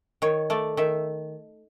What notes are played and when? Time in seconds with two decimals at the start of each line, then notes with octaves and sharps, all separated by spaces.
0.22 D#3 C#5
0.50 A3 D5
0.77 D#3 E5